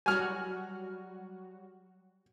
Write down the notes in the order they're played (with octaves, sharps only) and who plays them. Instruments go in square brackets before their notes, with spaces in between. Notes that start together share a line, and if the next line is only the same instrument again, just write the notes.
[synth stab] F#3 G3 F#4 [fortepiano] G#5 F6